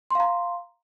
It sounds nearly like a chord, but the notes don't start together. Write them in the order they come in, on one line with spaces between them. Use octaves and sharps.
C6 F5 A#5